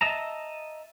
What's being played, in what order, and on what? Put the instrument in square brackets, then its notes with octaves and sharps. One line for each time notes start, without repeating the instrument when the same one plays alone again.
[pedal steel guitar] D#5 E5 A5 A#5